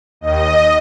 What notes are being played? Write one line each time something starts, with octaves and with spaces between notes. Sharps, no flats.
D#2 D#3 D#5